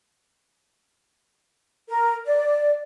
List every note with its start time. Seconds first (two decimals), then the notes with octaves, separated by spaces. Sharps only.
1.89 A#4
2.25 D5